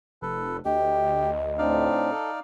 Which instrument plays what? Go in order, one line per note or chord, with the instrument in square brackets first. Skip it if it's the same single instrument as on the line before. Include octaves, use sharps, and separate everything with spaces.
[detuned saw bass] F1 [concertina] A4 B4
[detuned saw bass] D2 [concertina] G4 [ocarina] D#5
[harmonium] A2 C4 D4 [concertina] D#4 D5 F5
[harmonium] A4